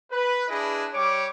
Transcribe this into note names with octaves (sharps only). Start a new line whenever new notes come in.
B4
D4 E4 G#4 B4 D#5
G3 C#5 D6